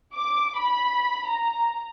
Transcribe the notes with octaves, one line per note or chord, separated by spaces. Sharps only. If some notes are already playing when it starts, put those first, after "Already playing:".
D6
B5
A#5